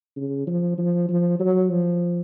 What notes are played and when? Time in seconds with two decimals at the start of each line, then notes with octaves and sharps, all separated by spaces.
0.16 C#3
0.47 F3
0.78 F3
1.09 F3
1.40 F#3
1.70 F3